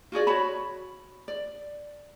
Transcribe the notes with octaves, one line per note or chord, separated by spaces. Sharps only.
F4 F#4 G#4 D5
F#4 C#5 A5 B5
D5